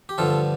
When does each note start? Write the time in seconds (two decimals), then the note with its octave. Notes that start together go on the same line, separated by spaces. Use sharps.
0.09 G4
0.18 G2 D3 F3 F4 A4